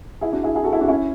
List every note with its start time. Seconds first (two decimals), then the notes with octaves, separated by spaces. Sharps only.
0.21 E4 G#4
0.32 D4 F#4
0.44 E4 G#4
0.55 E4 G#4
0.63 F#4 A4
0.72 E4 G#4
0.81 D4 F#4
0.88 C#4 E4